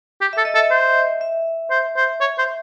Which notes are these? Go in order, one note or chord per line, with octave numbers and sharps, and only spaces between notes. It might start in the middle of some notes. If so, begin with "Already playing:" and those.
G4
A4 E5
D#5
A4 E5
C5
E5
C5
C5
C#5
C5